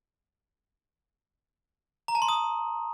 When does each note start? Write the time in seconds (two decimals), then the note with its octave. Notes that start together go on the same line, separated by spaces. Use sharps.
2.08 A#5
2.15 A5
2.22 C6
2.29 D#6